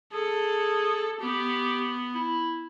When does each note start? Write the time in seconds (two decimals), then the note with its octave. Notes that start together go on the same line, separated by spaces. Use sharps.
0.13 G#4 A4
1.21 B3 G4
2.15 E4